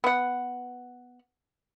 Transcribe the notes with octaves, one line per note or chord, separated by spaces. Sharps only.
B3 F#5